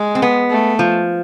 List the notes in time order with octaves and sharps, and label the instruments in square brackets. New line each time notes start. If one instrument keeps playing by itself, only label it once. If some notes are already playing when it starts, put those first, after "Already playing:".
Already playing: [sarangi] G#3
[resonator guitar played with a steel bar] C4
B3
[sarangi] A3
[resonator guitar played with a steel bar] F3